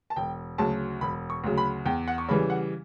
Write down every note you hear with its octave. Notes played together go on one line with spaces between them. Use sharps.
A5
E1 G5
D2 C#3 F#3 A5
E1 B5
C#6
D2 C#3 F#3
B5
E2 G5
F#5
C#6
C#3 E3 G3 B5
F#5